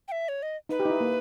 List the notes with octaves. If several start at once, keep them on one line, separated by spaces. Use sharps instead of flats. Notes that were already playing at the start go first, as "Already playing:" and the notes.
G5
E5
C#5
D#5
D#4 B4
G4
D#4
E4
A#3